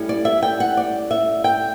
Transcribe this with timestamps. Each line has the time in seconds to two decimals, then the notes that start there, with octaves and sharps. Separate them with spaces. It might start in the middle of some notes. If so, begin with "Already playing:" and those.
Already playing: A2 G3 C#4
0.09 D5
0.25 E5
0.43 G5
0.60 F#5
0.77 D5
1.11 E5
1.44 G5